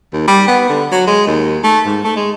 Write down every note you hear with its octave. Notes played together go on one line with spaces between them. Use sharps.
D#2
G3
B3
D3
F#3
G#3
D#2
A3
G#2
A3
G#3